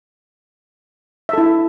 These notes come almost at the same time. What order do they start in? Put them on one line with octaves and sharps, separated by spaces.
E5 A4 E4